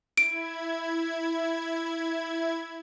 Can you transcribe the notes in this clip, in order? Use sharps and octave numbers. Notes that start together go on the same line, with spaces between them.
E4 G#6 D7